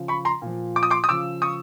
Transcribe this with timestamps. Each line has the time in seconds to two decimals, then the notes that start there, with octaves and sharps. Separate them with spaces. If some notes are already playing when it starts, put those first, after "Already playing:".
Already playing: C#3 F3
0.08 B5 C#6
0.25 A#5 C6
0.42 A#2 F3
0.76 D6
0.83 D#6
0.90 C6 D6
1.04 D#6
1.09 C#3 F3 D6 E6
1.42 C#6 D#6